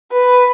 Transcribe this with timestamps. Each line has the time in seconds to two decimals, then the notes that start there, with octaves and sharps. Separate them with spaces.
0.12 B4